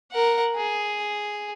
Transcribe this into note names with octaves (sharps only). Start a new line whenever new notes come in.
A#4 F#5
G#4